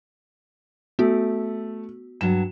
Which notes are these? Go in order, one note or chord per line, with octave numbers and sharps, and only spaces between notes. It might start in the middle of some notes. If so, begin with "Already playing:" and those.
A3 B3 F#4
G2 F#3 E7